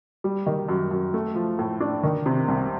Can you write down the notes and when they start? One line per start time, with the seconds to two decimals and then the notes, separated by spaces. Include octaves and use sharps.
0.24 G3
0.46 D#3
0.69 F#2
0.91 F#2
1.14 A3
1.35 F3
1.59 A2
1.80 D4
2.03 D#3
2.26 C3
2.48 C2